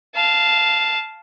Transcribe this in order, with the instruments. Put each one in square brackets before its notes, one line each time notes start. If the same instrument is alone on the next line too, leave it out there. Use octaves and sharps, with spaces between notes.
[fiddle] F5 A5